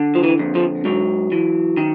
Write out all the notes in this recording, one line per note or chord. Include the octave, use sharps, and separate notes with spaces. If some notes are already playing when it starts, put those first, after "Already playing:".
Already playing: D3
F3
E3
F2
F3
G#2 F#3
E3
D#3